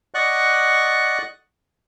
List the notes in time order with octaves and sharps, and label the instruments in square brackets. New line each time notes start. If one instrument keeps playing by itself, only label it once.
[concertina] D5 D#5 F#5 C#6 F#6